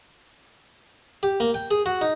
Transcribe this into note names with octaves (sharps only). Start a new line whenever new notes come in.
G4
A#3
G5
G#4
F#4
D#4